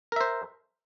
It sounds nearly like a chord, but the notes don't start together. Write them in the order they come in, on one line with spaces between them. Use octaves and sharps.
A#4 E5 C5